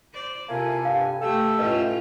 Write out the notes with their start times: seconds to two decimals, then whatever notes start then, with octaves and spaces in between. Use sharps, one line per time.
0.13 C5 D5
0.49 C3 A#3 E4 F4 A4 G#5
0.85 G2 F5
1.22 A3 G4 A4 E5 G5 E6
1.59 A2 C#4 F4 B4 D#5